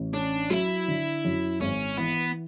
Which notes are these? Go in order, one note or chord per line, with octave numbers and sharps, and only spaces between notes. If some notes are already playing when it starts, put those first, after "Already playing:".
Already playing: A1
C#4 D4
F#3 E4
D3
F#2
G#1 C#4
E3 B3